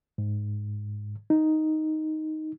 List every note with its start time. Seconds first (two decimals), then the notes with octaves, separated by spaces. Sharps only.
0.18 G#2
1.30 D#4